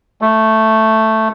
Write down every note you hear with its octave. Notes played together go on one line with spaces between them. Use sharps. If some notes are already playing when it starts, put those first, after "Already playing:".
A3